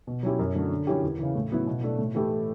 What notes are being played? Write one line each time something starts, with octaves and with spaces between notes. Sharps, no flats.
B2
F#3 C#4 E4 G4
F#2
D3 F#3 A3
D3
F#3 C#4 E4 G4
E2
C#3 E3
A2
F#3 B3 E4
B2
A3 D4
A2
E3 A3 E4 G4